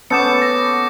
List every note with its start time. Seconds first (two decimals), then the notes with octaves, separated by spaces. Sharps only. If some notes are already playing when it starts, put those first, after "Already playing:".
0.10 B3 C#4 A4 D6 G6 C#7
0.42 A#6